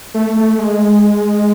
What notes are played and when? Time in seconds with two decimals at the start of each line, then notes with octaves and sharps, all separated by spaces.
0.14 A3
0.37 A3
0.58 G#3